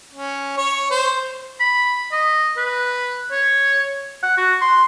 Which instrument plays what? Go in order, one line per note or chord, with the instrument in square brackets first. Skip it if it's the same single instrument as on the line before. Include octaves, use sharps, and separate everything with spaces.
[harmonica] C#4
C#5
C5
[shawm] B5
D#5
B4
C#5
[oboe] F#5
F#4
C6